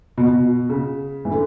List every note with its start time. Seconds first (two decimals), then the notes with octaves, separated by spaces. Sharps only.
0.18 B2
0.28 B2
0.69 C#3
1.25 E3
1.31 D3